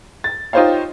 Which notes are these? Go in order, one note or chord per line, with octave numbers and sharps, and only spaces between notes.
A6
D#4 F4 G4 C5 C#5 F5